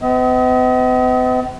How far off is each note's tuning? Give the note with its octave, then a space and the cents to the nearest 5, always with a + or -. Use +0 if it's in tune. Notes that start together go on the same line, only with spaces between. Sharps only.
B3 +45 D#5 +40